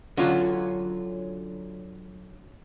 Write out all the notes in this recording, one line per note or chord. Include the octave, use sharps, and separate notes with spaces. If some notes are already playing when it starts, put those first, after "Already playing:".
D3 F#3 C#4 F4